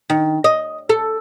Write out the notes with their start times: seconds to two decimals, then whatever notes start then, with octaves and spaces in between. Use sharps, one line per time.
0.10 D#3
0.44 D#5
0.89 A4